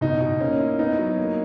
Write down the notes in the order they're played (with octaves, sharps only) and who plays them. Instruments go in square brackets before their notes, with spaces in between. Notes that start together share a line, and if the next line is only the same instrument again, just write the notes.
[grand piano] B2 [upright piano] D#4
[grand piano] B2
[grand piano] A#3 [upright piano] C#4
[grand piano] E4
[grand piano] B3 [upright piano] D#4
[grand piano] F#3
A#3